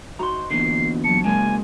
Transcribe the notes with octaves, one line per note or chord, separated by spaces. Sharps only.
D#4 F#4 C5 A#5 C6
E2 A#2 D3 C7
F#3 A5 C#7
C#3 G#3 A#3 G#5 C6